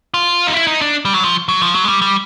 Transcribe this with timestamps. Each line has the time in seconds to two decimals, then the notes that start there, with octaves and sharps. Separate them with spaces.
0.14 F4
0.47 D#4
0.54 E4
0.67 D#4
0.81 D4
1.05 G3
1.14 F#3
1.24 F3
1.49 F#3
1.62 F3
1.75 F#3
1.85 G#3
1.89 G3
2.02 G3